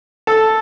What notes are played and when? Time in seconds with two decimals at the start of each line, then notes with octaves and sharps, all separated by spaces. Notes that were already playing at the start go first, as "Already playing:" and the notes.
0.27 A4